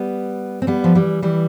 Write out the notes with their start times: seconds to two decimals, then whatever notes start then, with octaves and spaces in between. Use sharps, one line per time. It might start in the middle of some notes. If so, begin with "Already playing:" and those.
Already playing: G3 B3
0.62 C4
0.67 G3 B3
0.84 F3
0.95 E3 G3
1.23 E3 G3